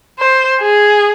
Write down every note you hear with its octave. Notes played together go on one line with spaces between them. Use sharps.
C5
G#4